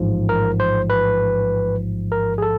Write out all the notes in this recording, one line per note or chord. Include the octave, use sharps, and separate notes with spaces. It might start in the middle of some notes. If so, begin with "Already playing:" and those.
Already playing: A1 G#2 F3
A#4
C5
B4
A#4
G#4
A4